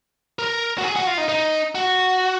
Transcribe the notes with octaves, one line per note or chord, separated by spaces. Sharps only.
A#4
F#4
G#4
F#4
F4
D#4
D#4
F#4